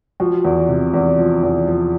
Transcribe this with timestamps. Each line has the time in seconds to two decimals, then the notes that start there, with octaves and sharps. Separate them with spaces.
0.20 F3 F#4
0.45 E2
0.69 C3
0.94 E2
1.19 F3
1.43 E2
1.67 F3